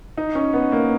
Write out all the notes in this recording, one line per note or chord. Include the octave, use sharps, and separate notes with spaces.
D#4
C#4
B3
A#3